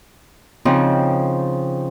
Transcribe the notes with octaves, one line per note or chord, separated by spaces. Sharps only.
C#3 F3 C4 D#4